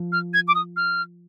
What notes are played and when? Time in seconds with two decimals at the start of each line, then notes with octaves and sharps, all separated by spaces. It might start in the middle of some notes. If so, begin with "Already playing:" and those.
Already playing: F3
0.12 F6
0.34 G#6
0.48 D6
0.55 D#6
0.77 F6